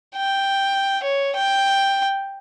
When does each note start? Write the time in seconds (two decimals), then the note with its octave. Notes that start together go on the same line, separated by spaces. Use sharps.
0.16 G5
1.03 C#5
1.35 G5